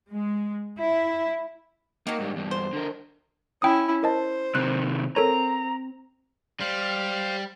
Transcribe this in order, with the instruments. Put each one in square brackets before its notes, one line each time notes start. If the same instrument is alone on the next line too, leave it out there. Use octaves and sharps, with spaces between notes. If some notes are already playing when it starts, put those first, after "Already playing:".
[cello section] G#3
E4
[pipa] D#3 F#3 [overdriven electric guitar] A#3
[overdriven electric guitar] G#2 G3
E2 G2
[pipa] C5
[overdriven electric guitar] D3 A#4
[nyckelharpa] C#4 E4 [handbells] G5 D#6
[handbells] A#4 D#5 A5 [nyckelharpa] C5
[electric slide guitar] C3 D#3 C4 [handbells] F#6
[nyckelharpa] C4 [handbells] A4 A#4 C#5 [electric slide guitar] A#5
[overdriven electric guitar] G3 [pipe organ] C5 F5